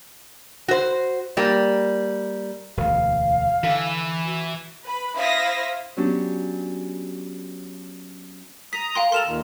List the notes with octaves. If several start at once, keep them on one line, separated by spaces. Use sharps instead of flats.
F#4 C5
G3 A#3
E1 D2 F5
D3 E3 B4
F#4
B4 B5
E4 C5 F5 D#6 A#6 B6
F#3 B3 C#4 D4 G4
A#5 D#6 B6
F5 G5 C6
A4 A#4 C6 E7 F7
D#2 A#2 D#3